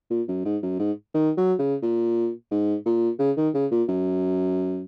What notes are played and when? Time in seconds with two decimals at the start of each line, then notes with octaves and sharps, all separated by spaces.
0.11 A#2
0.28 F#2
0.45 G#2
0.63 F#2
0.80 G#2
1.14 D#3
1.37 F#3
1.59 C#3
1.82 A#2
2.51 G#2
2.86 A#2
3.19 C#3
3.37 D#3
3.54 C#3
3.71 A#2
3.89 F#2